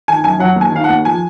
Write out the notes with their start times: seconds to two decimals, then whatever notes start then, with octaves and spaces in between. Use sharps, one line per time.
0.08 D#3 G#5
0.24 F#2 G#5
0.39 F#3 F#5
0.56 D#2
0.61 G#5
0.72 D#3 F5
0.84 F#5
0.89 D#2
1.05 F3 G#5